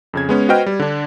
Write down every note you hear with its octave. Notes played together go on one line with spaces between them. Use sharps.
F2 C#3 G#6
G#3 B3 C#4
F#4 B4 C5 D#5 G5 F6
G3
D3 D4